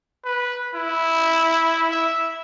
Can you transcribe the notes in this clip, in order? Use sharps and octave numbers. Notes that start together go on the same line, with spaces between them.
B4
E4
E5